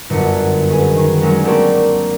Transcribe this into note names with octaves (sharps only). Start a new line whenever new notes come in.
G1 F#2 D3
C#4 G#4 B4
D#3
F#3 G#3 C#4 D4
A3 A#3 C4 G4 A4 D5